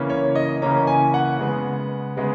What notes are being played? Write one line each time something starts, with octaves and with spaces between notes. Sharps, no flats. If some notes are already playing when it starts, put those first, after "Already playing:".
Already playing: C#3 E3 A#3 C#4
C#5
D#5
C#3 E3 A#3 C#4 A#5
G#5
F#5
C#3 G#3 B3
C#3 G#3 B3